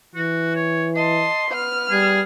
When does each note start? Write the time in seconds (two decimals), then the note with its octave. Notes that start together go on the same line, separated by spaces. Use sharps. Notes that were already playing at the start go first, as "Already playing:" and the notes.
0.15 E3 F#4
0.55 C#5
0.96 D#5 A5 C6
1.51 B3 F6
1.91 G3 G#4